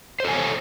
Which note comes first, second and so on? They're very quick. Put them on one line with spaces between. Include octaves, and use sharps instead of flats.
C5 A4 G#5 C#5